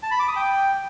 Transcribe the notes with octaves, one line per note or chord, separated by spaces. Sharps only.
A5
B5
D6
D#6
G5